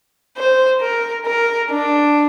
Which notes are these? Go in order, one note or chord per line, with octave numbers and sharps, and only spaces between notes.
C5
A#4
A#4
D4